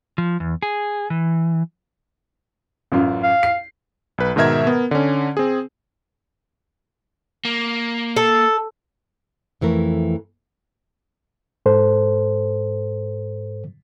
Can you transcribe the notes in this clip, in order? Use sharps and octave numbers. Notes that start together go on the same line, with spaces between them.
F3
E2
G#4
E3
A1 F#2 F4
F5
C7
B1 B4
G#2 B2 D#3 A#4 E5 G#6
B3 A#4
D3 C#4
C4 G#4
A#3
A4
F2 E3 A3 A#4
G#2 A4 C5